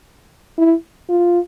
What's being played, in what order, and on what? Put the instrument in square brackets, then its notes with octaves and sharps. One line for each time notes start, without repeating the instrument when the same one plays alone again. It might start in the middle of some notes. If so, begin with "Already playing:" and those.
[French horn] E4
F4